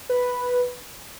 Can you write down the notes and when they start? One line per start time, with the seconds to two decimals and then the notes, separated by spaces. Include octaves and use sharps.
0.09 B4